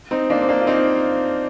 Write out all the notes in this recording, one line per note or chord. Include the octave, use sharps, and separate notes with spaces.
C4 D#4
A#3 D4
C4
A#3 D4
F4
C4 D#4